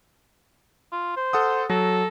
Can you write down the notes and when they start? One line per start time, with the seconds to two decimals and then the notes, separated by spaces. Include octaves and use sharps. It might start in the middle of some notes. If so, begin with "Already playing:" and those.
0.92 F4
1.17 C5
1.33 A4 F#5 D#6
1.70 F#3 A4 A#6